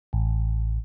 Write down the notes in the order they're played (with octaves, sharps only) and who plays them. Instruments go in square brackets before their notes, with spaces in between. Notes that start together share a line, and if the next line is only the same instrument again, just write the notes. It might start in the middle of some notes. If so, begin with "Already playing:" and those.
[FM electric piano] A1